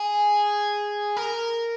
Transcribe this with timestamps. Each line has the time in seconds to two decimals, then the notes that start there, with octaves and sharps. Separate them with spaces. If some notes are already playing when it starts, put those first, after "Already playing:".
Already playing: G#4
1.17 A#4